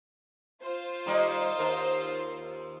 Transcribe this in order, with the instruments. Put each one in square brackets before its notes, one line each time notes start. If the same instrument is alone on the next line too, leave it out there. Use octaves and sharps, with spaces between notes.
[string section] F4 C5
[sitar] D#3 G3 A#3
D#2 A#4